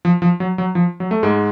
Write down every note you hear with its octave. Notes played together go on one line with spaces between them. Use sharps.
F3
F3
F#3
F#3
F3
F#3
A3
G#2 G#3